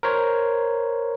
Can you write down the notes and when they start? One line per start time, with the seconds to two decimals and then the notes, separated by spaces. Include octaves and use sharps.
0.03 A#4 C5 C#5